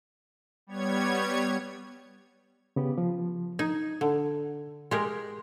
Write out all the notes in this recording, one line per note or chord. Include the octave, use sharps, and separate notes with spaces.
G3 B3 C#5 G#6
C#3 B3 G4
F3
D#4 G#6
D3
G#3 G4 A#4 C6